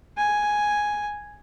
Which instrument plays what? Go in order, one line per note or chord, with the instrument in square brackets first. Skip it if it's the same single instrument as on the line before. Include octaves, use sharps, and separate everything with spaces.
[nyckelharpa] G#5